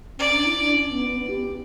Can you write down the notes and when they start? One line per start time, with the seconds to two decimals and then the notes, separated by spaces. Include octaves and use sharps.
0.18 C#4 D5
0.31 D4
0.46 E4
0.59 D4
0.74 C#4
0.91 B3
1.09 B3
1.28 G4